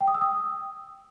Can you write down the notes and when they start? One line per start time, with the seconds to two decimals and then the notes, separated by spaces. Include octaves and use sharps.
0.01 G5
0.07 D#6
0.14 E6
0.21 D#6